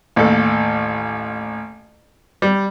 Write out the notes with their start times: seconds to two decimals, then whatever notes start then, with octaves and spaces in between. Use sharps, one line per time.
0.16 A1 D#2 A4
2.42 G3